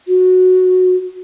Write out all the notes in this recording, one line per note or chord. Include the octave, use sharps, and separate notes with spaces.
F#4